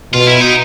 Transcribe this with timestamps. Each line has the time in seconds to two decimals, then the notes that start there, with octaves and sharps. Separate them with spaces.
0.13 B2 F4
0.26 E4
0.40 D#4